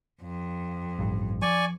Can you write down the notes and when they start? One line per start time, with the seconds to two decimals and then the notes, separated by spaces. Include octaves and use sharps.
0.23 F2
0.99 A1 G2
1.42 F3 D5 G#5 C#6